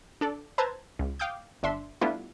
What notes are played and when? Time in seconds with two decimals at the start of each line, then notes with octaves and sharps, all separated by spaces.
0.21 D4 A4 D5
0.58 B4 C5 A5 A#5 E6 G#6
0.99 C#2
1.19 F5 G5 D6 D#6 G6
1.63 G1 D4 E5 C6
2.01 G3 A3 B3 D4 E4 F4